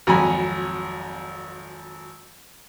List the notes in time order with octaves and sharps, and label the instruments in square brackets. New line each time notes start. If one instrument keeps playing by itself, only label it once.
[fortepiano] G#1 F2 F#3 G#5 A#5 B5